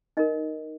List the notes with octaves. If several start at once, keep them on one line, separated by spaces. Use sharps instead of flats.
D#4 A#4 D#5